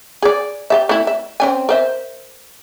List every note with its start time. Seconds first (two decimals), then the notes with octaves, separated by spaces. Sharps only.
0.22 G#4 D5
0.70 G4 A4 E5
0.89 A3 E4
1.07 E5
1.40 C4 C#4 G#5
1.69 A#4 C5 E5